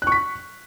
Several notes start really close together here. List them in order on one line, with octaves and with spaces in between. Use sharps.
F#6 C#6 B6